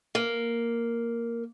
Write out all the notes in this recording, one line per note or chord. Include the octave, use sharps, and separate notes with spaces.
A#3